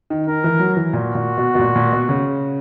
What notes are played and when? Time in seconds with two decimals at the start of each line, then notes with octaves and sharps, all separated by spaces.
0.10 D#3
0.27 D#3 A#4
0.44 E3
0.59 F#3
0.77 E3
0.93 A#2 F#4
1.15 A#2
1.38 B2
1.55 B2
1.59 A#2
1.76 A#2
1.92 B2
2.09 C#3